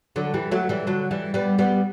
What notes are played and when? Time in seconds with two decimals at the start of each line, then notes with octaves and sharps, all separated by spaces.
0.16 D3 F#3
0.34 E3 G3
0.51 F#3 A3
0.69 E3 G3
0.87 D3 F#3
1.11 E3 G3
1.34 G3 B3
1.59 G3 B3